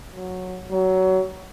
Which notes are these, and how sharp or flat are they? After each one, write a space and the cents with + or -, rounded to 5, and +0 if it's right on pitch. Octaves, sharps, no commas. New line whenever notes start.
F#3 -10
F#3 +20